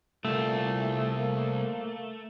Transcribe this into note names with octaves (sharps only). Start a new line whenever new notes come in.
C2 A#2 A3
A#3